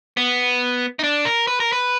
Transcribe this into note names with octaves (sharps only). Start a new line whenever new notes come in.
B3
D#4
D4
A#4
B4
A#4
B4